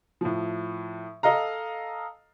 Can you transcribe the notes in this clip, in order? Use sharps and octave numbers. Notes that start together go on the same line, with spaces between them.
A2 F3
A4 D#5 F5 A#5